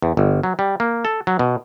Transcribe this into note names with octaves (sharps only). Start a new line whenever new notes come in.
E2
G1
F#3
G3
A#3
A4
F#3
B2